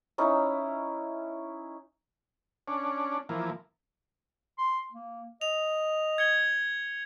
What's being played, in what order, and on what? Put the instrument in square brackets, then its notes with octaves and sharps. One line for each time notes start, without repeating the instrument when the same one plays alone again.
[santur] C#4 D#4 E4
[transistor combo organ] C#4 D4
E3 F3 A#3
[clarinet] C6
A#3
[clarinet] D#5 [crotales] F7
[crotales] G#6 C#7 G7